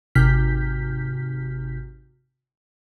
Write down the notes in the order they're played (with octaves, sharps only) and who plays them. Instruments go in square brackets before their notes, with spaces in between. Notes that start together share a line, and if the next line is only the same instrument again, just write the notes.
[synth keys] G#1 C3 F6 G6 B6